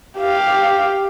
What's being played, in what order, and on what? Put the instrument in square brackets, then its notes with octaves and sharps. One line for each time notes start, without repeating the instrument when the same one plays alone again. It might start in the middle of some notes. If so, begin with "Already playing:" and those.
[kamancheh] G4 F5